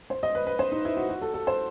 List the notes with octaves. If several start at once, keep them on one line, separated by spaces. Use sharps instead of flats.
C5
D#5
B4
B4
C5
D#4
E4
F#4
F#4
A4
A4
C5